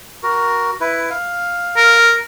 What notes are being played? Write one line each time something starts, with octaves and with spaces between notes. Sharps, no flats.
F#4 A#4
E4 B4
F5
A#4